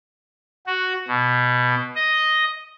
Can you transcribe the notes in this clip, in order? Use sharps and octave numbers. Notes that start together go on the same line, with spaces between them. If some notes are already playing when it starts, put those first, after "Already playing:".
F#4
B2
D#5